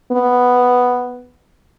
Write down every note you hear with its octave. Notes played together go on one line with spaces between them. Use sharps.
B3